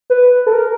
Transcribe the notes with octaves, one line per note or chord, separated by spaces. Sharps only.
B4
A4
A#4